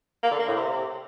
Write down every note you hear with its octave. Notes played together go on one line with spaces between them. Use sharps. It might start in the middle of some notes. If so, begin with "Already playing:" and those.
A#3
D3
A#3
A2
C3